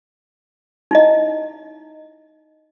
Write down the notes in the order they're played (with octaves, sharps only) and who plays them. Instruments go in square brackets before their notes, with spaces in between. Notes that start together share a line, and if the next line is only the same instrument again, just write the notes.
[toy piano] D#4 E4 D#5